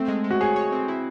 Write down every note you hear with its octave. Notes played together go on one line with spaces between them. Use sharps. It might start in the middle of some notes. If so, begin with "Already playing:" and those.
Already playing: A3 C4
G#3
G#3
F#4
G#4 C#5
C#5
C4
E4